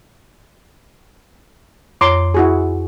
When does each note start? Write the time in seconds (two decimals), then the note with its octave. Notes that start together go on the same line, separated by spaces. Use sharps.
2.01 F2 C#5 A#5 C6 D6
2.34 E4 F#4 G#4